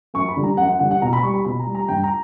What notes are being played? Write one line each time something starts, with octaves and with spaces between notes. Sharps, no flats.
F#2 C#6
B5
D3 G3
A#5
F#2 F#5
F#5
D3 G3 F#5
F#5
B2 A#5
B5
G3 C#6
B5
B2 B5
A#5
G3
A#5
G2 G5
A#5